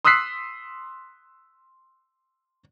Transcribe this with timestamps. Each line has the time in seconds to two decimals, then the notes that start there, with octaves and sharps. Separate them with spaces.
0.05 C6 D#6 E6 F#6 B6 C7